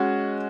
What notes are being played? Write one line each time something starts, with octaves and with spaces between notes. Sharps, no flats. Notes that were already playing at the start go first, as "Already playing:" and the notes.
Already playing: G#3 C#4 F#4